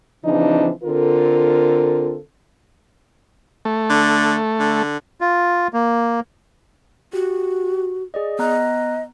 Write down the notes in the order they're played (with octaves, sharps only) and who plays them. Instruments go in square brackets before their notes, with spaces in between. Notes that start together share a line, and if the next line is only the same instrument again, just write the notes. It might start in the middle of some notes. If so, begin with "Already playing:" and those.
[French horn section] C#3 E3 F3 C4 D4 D#4
D3 C4 F4 A4 A#4
[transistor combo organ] A3
[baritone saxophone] D3
D3
[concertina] F4
A#3
[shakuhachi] F#4 [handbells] G4
[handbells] G#4 D5 D#5
[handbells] B3 A#5 F#6 [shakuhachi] D#5